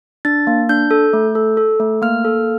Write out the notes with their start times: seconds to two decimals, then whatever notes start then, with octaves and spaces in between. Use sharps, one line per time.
0.25 D4 A6
0.47 A#3
0.69 D4 G6
0.91 A4
1.13 A3
1.35 A4
1.57 A4
1.80 A3
2.02 A#3 F6
2.24 A4